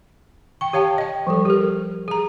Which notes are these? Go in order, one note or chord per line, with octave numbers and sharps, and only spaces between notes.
G5 C#6
G4 C#5 F5 G5 A5
D#5 G5
F3 G3 A4
G4 A#4
G#4 A#5